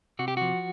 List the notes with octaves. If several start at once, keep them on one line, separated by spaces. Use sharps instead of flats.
C3 F#4
G4
F3 F#4